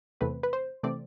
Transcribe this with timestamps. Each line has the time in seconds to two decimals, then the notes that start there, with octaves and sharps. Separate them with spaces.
0.21 E2 C3 E3 A3 C4 B4
0.43 B4
0.53 C5
0.83 C3 E3 A3 C4 D5